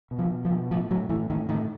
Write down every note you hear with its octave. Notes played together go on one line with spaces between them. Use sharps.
B2
F3
B2
F3
B2
A2 F3
A2 F#3
A2 E3
A2 D#3
A2 D#3